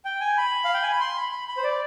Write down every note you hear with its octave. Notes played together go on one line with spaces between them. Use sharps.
G5
G#5
B5
F5
G5
G#5
B5
C6
B5
B5
B5
C5
D5